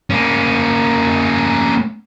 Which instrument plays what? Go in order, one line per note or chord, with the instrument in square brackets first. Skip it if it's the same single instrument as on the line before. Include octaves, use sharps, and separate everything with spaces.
[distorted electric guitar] A#3 C#4